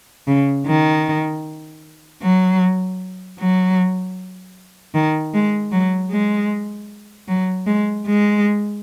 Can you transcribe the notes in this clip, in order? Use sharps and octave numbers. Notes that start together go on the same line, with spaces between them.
C#3
D#3
F#3
F#3
D#3
G#3
F#3
G#3
F#3
G#3
G#3